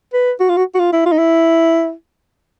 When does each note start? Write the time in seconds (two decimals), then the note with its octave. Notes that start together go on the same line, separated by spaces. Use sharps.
0.13 B4
0.40 F#4
0.49 F4
0.57 F#4
0.75 F#4
0.79 F4
0.93 E4
1.06 F4
1.12 D#4
1.19 E4